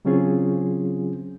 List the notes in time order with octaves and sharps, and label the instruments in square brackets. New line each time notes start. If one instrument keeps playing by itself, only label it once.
[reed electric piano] C#3 F#3 C4 C#4 F4 G#4